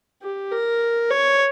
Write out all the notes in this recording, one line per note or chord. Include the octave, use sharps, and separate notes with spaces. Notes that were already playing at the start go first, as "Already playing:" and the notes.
G4
A#4
C#5